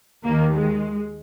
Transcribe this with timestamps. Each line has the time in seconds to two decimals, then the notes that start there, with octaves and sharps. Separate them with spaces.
0.24 D#2 D#3 A#3
0.54 G#3